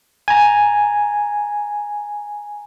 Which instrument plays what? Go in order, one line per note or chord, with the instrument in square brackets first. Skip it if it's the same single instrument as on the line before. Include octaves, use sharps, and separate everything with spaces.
[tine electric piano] G#5 A#5